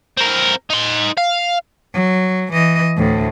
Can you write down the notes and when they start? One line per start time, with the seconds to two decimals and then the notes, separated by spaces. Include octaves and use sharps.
0.17 C4 A#4
0.70 D#4 C6
1.18 F5
1.94 F#3
2.53 E3 D#5
2.97 D2 A2